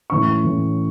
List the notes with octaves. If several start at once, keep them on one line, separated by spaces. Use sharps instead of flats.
A2 E3 C#4 C#6
A2 E3 C#4